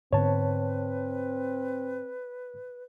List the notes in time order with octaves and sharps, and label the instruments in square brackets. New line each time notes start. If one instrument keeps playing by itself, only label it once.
[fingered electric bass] G#2 D3 B3 [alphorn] C4 [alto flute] B4 [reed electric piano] C#5 A5